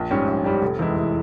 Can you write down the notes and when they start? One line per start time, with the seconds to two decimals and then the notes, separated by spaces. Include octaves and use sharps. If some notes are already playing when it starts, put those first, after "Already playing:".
Already playing: A#1
0.11 G#2 G3 C#4 G4
0.27 A#1
0.44 G#2 G3 C#4 G4
0.62 F1
0.79 E2 E3 G#3 E4
0.96 F1